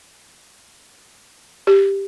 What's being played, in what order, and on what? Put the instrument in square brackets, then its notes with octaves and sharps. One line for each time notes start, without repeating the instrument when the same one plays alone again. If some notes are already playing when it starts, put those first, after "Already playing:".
[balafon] G4